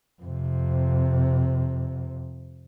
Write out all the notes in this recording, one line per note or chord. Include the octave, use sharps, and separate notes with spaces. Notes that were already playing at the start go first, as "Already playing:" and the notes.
F2 C3